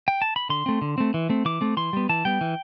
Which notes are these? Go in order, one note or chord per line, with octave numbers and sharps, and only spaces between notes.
G5
A5
B5
D3 C6
A3 C4
D3
A3 C4
E3
A3 C4
E3 D6
A3 C4
E3 C6
G3 B3
E3 A5
G3 B3 G5
E3